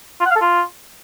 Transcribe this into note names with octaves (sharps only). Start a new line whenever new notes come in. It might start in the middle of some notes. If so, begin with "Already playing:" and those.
F4
F#5
F5
A4
F4